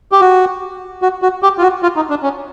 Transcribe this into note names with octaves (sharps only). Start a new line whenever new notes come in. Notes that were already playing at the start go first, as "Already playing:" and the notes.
G4
F#4
F#4
F#4
G4
F4
F#4
F4
D#4
D4
C#4